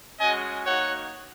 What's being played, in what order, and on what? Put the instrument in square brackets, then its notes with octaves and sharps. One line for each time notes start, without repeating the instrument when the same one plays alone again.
[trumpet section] G#3 C#4 F#4 D#5 G#5
A#3 D#4 F#4 C#5 F#5